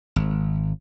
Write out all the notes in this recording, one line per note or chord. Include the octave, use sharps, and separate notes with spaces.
G#1